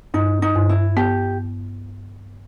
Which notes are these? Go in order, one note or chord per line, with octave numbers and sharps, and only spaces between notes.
G2 D#4
D#4
G2
E4
B3 G4